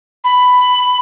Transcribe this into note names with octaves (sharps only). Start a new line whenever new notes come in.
B5